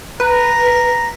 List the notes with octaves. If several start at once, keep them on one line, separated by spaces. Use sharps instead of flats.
B4 A#5